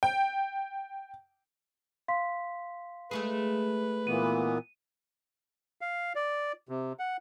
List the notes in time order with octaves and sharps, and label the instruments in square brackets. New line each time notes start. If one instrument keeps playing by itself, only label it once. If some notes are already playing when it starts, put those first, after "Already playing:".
[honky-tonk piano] G5
[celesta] F5 C6 B6
[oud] G#3 A3 G#4 [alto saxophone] B4
[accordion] A#2 E3 B3 [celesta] D#7
[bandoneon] F5
D5
C3
F#5